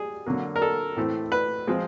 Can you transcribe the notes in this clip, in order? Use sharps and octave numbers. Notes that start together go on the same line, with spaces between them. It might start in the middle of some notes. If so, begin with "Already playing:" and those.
Already playing: G3 G#4
D3 F#3 A#3
A#4
A4
A2 E3 A3 C4
B4
F3 G#3 C4